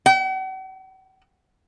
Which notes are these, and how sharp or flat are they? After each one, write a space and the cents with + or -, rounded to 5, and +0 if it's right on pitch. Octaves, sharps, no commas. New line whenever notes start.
F#5 +45